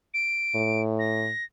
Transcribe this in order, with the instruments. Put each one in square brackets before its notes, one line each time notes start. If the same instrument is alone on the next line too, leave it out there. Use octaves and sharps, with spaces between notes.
[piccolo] D7
[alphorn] A2
[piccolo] A#6